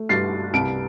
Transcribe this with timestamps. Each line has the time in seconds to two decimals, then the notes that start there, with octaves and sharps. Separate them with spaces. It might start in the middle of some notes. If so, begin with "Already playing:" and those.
Already playing: A3
0.09 G2 A6 C7
0.54 C2 D7